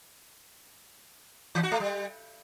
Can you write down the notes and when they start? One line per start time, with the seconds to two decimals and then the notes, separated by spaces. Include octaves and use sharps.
1.55 E3
1.63 F#4
1.72 A3
1.80 G3